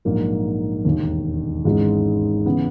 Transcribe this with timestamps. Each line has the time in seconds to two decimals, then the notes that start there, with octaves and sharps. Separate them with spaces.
0.05 A#1 G#2 F#3 A#3
0.85 E1 D#2 D#3
1.65 G#1 G#2 E3 G#3 C#4
2.46 C#3 E3 B3